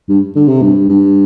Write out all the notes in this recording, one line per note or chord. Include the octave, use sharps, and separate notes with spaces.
G2
D3
C3
G2
G2